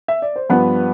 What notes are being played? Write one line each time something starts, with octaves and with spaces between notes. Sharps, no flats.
E5
D5
C5
G2 F3 B3 B4